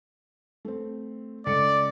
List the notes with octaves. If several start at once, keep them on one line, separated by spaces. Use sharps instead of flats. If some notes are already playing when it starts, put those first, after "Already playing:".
A3 C4
C#2 A4 D5 C#7